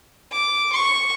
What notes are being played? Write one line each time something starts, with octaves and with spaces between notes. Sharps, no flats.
D6
C#6